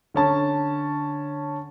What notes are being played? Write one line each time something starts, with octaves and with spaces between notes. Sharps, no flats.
D3 C#4 A5